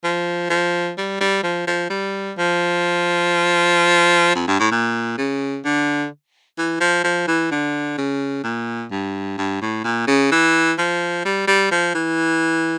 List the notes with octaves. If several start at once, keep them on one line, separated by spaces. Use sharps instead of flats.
F3
F3
G3
G3
F3
F3
G3
F3
F2
G2
A2
A#2
C#3
D3
E3
F3
F3
E3
D3
C#3
A#2
G2
G2
A2
A#2
C#3
E3
F3
G3
G3
F3
E3